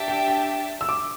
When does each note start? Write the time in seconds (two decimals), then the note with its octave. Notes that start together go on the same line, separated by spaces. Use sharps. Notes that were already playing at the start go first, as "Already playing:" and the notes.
Already playing: D4 G4 E5 A5
0.08 G5
0.28 G5
0.81 E6
0.89 D6